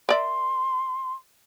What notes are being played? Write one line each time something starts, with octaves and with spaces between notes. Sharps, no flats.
A#4 D5 E5 C6